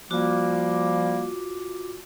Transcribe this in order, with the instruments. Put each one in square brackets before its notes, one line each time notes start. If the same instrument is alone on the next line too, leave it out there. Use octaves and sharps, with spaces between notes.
[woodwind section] F3 G3 A#3 [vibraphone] F4 F#4 D6